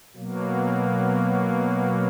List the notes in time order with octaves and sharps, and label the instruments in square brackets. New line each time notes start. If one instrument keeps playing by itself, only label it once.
[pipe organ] B2 F#3 A#3